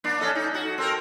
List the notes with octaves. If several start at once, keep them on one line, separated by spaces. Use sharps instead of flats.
A#3 D4
C#4 A4 D#5
D#4
F#4
C4 A4 A#4